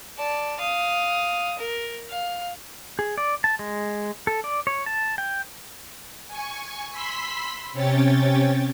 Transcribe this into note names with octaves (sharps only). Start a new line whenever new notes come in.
D5 A5
F5 D#6
A#4
F5
G#4
D5
A5
G#3
A4
D5
C#5
A5
G5
G#5 C#6
B5 C6 E6 B6
C3 C#4 C#5 G5 A6